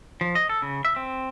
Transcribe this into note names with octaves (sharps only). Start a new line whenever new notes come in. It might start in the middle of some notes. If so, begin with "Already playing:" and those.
F3
D#5
A4
C#3
E5
C4